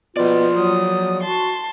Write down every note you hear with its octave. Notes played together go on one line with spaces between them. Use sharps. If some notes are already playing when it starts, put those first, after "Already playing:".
B2 F3 F4 D5
F#3 D#6
F#4 A5 C6